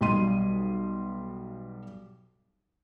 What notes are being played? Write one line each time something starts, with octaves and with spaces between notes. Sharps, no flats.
B1 G3 D#5 C6 D#7